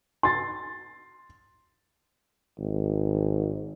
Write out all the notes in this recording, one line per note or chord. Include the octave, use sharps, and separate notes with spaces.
C6 A6
G#1